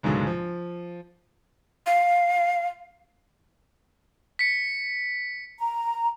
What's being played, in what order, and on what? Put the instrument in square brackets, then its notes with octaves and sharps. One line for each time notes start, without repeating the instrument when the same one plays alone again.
[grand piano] C#2 G#2 B2 D3 F#3 G#3
F3
[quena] F5
[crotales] B6 C#7
[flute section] A#5